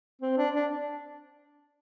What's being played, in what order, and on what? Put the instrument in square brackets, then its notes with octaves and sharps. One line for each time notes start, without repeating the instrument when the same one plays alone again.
[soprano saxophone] C4
D4
D4